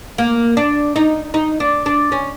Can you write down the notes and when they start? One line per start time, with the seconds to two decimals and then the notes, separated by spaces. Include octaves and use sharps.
0.18 A#3
0.57 D4
0.96 D#4
1.34 D#4
1.60 D4
1.86 D4
2.12 C#4